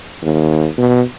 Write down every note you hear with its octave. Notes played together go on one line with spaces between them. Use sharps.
D#2
B2